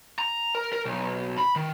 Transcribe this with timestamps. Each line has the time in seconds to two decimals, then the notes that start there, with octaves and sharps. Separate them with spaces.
0.19 A#5
0.55 A#4
0.73 A#4
0.85 B1
1.38 B5
1.56 D#3